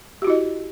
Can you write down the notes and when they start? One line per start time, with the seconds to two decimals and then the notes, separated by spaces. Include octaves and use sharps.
0.22 G4
0.25 F#4
0.27 E4
0.30 D#5